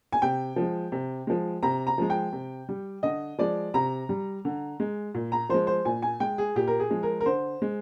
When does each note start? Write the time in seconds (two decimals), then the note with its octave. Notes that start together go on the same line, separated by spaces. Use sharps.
0.12 G#5
0.22 C3 G5
0.56 F3
0.62 G#3
0.92 C3
1.27 F3 G#3
1.63 C3 A#5
1.87 A#5
1.98 F3 G#3
2.10 G5
2.32 C3
2.69 G3
3.03 D3 D#5
3.39 F3 G#3 D5
3.74 C3 A#5
4.09 G3
4.45 D3
4.80 G#3
5.15 A#2
5.32 A#5
5.49 F3 G#3 C5
5.67 C5
5.85 A#2 G#5
6.02 G#5
6.20 G#3 G5
6.38 G#4
6.56 A#2 G4
6.67 A#4
6.79 G#4
6.90 F3 G#3
7.03 A#4
7.21 A#4
7.26 D3 C5
7.62 G#3